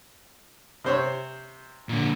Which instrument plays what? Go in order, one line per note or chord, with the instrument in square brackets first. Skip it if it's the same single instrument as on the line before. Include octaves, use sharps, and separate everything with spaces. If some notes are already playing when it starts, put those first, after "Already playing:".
[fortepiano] C3 C5 C#5
[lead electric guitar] A#2 D3